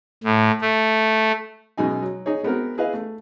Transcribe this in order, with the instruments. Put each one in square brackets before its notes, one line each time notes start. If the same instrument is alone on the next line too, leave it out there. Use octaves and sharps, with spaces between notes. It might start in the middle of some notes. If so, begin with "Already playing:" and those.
[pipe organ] A2
A3
[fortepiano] F#2 B2 G#3 D#4 G#5
F#3
D#4 G#4 C#5
G#3 B3 C4 F#4 A#4
E4 G#4 B4 D#5 F5
A3